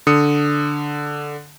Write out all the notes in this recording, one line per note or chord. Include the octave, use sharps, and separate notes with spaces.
D3 D#6 C#7